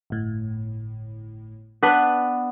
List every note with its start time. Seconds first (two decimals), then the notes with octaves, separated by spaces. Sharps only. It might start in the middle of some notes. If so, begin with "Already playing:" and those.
0.10 G1 A2
1.83 B3 D4 B4